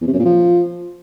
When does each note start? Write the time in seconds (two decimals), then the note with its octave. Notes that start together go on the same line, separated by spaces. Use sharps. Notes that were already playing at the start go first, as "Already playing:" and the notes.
0.01 E2
0.07 C3
0.13 F#2
0.19 A#2
0.25 F3